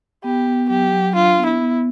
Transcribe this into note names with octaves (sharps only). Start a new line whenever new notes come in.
B3 G4
B3
F#3 G4
F#3
D4 F4
B3
E4
B3